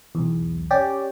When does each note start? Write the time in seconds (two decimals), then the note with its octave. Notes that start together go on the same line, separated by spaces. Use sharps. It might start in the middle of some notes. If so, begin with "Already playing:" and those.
0.15 B1 E2
0.71 C#4 G4 D5